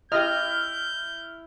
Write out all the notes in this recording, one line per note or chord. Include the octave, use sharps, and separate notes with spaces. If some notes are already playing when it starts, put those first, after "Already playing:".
E4 G4 D#5 F6 G6